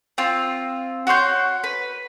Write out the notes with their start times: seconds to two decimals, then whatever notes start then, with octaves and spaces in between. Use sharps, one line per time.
0.18 C4 F4
1.07 F#4 C#5 C6 G6
1.64 B4